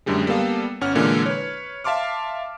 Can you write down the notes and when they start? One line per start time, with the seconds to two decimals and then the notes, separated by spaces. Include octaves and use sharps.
0.06 F#2 A2 D3 G3 G#3
0.27 G3 A#3 B3 A4 F5
0.81 G1 C#4 F#5 F6
0.95 A#2 D3 E3 G#3 A#3
1.26 B4 C#5
1.84 E5 F5 A5 C6 D6 F6